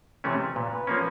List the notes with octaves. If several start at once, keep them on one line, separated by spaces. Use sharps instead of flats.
C3 E3 A3 C#4
A#2 B4
F3 A#3 C#4